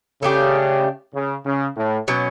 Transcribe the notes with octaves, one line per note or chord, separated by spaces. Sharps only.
C#3 A3 D4 G4
C#3
C#3
A2
B2 F#3 C#4